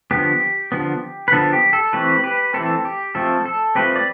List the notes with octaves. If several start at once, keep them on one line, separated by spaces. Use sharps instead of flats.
D3 F3 B3 G4
D3 F3 B3
B4
D3 F3 B3 A4
G4
A4
E3 A3 C4 G4 B4
G4 B4
E3 A3 C4 A4
G4
F3 A3 C4 A4
A4
F3 A3 C4 G4 B4
D5